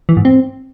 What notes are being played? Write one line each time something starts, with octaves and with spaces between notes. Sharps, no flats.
E3
G#2
C4